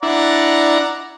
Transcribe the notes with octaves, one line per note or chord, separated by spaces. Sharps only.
D4 E4 D5 F#5 A#5